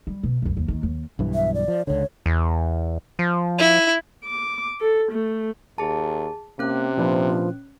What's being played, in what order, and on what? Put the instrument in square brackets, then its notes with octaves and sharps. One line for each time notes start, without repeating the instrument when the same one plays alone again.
[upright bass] G3
B2
C#2 F#2
D#2
D#2 D#3
D#2
[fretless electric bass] B1 G2 E3
[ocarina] E5
D5
[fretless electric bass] F3
[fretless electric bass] C#2 D3 [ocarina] C#5
[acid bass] E2
F3
[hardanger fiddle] E4
[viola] D6
A4
A3
[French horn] D#2 [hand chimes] G#4 A5
[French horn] C3 [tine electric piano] A#3 [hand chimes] C#4 F#6
[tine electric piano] A#2 D4 B4 [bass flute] F3